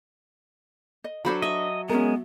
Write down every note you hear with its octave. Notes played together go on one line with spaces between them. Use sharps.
D#5
F#3 D4 F#4 A4 C5 B5
D#5 E5 C#6
G#3 B3 C#4 G#4 A#4